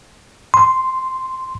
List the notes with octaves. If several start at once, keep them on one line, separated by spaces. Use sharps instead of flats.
C6